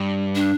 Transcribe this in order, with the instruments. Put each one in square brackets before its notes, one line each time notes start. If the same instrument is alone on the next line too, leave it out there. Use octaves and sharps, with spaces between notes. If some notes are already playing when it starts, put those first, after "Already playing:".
Already playing: [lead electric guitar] G2
[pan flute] D4